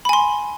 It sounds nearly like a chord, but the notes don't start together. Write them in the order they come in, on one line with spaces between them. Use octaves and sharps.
B5 G#5 C6